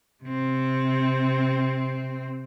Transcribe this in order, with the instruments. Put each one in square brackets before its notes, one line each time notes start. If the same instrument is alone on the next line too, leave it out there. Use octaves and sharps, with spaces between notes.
[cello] C3 C4